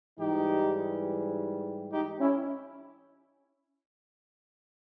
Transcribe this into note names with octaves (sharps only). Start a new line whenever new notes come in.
G#2 E3 G3 D#4 G4
D#4 G4
C#4 E4